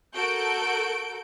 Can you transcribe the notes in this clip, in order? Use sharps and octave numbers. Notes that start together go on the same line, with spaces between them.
F#4 A4 A#4 G6 D7